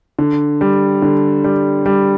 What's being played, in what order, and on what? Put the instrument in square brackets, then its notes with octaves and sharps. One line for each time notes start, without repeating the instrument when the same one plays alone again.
[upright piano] D3
G3
D3
G3
G3